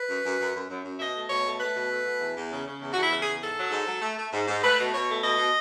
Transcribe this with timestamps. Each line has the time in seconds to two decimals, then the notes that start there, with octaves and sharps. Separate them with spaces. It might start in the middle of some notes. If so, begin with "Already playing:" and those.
Already playing: B4
0.09 F#2
0.25 F#2
0.40 F#2
0.55 F#2
0.70 F#2
0.85 F#2
0.96 E5
1.00 B2 D#5
1.15 A3
1.29 B2 C#5
1.45 A3
1.60 A3 B4
1.75 B2
1.91 A3
2.05 B2
2.20 E2
2.36 E2
2.51 C#3
2.66 C#3
2.81 E2
2.92 F#4
2.97 E2 E4
3.11 C#3
3.22 E2 G#4
3.42 G#2 A4
3.56 F#3
3.71 G#2
3.86 F#3
4.01 A3
4.17 A3
4.32 G#2
4.48 G#2
4.62 A3 B4
4.78 B2
4.93 B2 C#5
5.08 A3
5.23 B2 D#5
5.38 B2